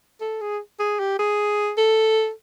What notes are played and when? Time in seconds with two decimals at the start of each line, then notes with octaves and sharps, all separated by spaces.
0.21 A4
0.41 G#4
0.79 G#4
0.99 G4
1.19 G#4
1.77 A4